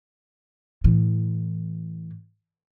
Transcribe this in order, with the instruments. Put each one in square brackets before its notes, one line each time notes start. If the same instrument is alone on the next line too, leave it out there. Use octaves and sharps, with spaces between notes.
[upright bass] A2 E3